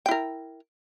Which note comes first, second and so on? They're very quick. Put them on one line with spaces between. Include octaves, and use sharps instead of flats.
G5 E4 A#4